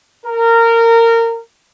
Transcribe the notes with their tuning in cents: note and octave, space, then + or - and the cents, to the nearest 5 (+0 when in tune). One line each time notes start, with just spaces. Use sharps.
A#4 -20